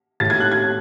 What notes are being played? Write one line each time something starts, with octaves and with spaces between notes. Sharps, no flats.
A2 A6
G#6
F#6
G#6